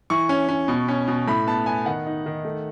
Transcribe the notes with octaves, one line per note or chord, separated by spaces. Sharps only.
E3 C#6
C#4
C#4
B2
C#4
B2
A2 B5
B3 A5
B3 G#5
D#3 F#5
D#4
D#3
A3